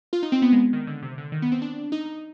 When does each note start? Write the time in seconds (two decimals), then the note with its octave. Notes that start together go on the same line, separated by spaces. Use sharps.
0.13 F4
0.23 D#4
0.32 C4
0.42 B3
0.53 G#3
0.73 D#3
0.87 D3
1.02 C3
1.18 D3
1.32 D#3
1.42 B3
1.52 C4
1.62 D4
1.92 D#4